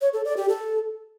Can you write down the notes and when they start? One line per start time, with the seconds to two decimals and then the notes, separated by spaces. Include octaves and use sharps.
0.01 C#5
0.13 A4
0.25 D5
0.37 G4
0.49 A4